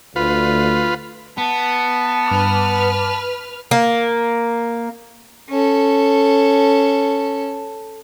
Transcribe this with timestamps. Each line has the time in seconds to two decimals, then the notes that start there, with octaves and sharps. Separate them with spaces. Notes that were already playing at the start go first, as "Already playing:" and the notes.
0.16 D2 F4 B4
1.38 B3 A5
2.27 G2 B4 D6 F6
3.71 A#3
5.49 C#4 A4